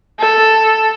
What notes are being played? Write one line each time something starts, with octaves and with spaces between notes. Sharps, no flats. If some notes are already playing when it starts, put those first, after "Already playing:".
A4